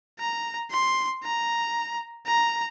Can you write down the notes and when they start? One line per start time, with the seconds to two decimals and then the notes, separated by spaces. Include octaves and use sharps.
0.20 A#5
0.71 C6
1.23 A#5
2.27 A#5